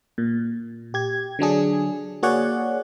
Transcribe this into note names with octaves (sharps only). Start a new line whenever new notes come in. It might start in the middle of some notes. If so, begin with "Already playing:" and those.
A#2
G4 G#6
D3 F#3 D4 G#4
A#3 F#4 G#4 C#5 D5 F#5